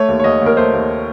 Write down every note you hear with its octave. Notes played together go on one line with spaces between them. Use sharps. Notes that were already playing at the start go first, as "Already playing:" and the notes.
Already playing: A3 C#5
D#2
C#5
D#2 D#5
D#2
A#4
A3 C5
D#2